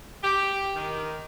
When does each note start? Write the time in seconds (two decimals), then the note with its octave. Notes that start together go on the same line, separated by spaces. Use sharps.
0.23 G4
0.76 D#3